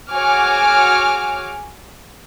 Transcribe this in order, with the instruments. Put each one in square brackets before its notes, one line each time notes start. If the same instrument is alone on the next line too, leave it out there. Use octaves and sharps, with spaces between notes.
[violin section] F#4 G#4 C#5 G#5 D6 F6